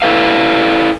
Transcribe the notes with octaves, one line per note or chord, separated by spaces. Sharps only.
E4 A4 B4 F5